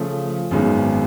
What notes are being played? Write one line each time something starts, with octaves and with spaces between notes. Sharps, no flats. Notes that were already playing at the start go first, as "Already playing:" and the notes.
Already playing: C#3 F3 A3
G#1 F#2 D#3 G#3 B3